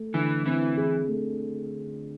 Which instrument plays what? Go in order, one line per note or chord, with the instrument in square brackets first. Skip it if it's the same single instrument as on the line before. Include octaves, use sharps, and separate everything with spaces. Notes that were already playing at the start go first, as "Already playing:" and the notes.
Already playing: [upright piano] A3
[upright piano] D3 [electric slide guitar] E3 E4
[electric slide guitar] E3 E4 [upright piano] C4
[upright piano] G#4
A3